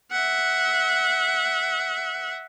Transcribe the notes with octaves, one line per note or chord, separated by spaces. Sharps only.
E5 F#5